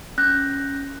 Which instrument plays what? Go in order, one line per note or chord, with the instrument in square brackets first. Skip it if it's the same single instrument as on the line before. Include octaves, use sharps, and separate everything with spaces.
[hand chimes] C#4 F#6 G6 A#6